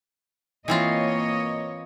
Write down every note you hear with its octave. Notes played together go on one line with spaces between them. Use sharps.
E3 A#3 C4 F4 C#5 D#5